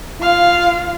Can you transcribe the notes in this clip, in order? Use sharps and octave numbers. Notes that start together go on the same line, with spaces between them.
F4 F5